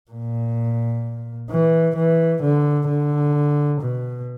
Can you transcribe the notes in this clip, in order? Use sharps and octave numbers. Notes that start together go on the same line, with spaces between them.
A#2
E3
E3
D3
D3
B2